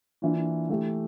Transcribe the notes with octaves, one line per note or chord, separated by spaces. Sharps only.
E3 A#3 D4 F4
E3 A3 E4 G4